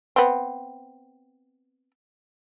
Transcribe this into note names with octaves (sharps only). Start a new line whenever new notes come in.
B3 C4